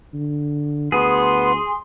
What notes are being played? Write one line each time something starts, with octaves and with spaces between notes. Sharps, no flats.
D3
D2 B3 G#4 C6